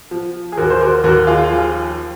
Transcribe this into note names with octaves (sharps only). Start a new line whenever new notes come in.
F3
G#4
D#2 F#4 A#4
C5
F#4 A#4
D#2 F#4 A#4
F4 G#4
F3